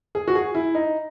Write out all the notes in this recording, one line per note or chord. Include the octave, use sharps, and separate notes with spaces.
G#4
F#4
G#4
E4
D#4